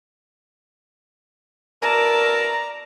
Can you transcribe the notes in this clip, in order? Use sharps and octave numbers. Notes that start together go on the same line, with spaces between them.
B2 E4 A#4 D5 A5 A#5